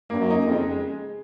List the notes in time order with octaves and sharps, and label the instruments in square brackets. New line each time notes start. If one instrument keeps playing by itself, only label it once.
[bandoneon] G2 [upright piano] A#3
[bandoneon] F#2
[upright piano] D#4
[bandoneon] F2
[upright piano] C#3
G#3
G#3